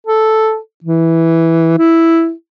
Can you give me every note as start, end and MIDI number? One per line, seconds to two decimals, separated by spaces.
0.07 0.57 69
0.84 1.76 52
1.78 2.31 64